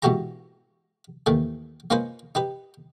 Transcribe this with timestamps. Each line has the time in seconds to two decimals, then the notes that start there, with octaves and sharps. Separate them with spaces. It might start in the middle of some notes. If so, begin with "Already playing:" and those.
0.03 G#2 B2 E3 F#4 G4 A#5
1.26 D#2 A2 D#3 E3 A3
1.90 A#3 C#4 D#4 F4 B4 C5
2.35 D#4 G4 B4